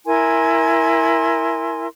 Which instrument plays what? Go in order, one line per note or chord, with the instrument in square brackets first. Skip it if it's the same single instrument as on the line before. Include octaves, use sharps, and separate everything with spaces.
[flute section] E4 A#4 G#5 C6